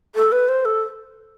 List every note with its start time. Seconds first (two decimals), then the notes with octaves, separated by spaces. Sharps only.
0.15 A4
0.32 B4
0.48 C5
0.65 A4